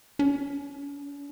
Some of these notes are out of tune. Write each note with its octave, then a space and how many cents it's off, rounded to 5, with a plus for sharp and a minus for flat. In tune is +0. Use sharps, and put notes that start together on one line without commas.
C#4 +45